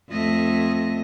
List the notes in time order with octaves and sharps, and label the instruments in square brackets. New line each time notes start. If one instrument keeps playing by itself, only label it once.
[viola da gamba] F2 A3 D#5